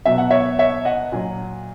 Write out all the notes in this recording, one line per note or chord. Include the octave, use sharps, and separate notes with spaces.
B2 F#3 E5
F#5
C#5 E5
C#5 E5
D#5 F#5
A#2 F#3